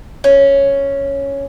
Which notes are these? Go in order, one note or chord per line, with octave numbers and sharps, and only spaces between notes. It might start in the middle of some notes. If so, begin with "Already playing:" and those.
C#4